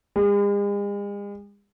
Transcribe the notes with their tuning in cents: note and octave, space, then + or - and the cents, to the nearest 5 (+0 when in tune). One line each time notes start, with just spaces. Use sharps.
G#3 -45